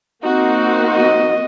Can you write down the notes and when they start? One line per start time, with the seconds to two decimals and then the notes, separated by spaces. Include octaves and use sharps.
0.24 A#3 C4 D#4 F#4
0.95 D#5